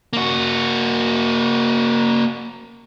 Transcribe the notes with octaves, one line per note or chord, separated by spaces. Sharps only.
A#3 F#4